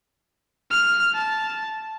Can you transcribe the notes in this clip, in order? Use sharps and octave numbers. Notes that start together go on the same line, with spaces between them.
F6
A5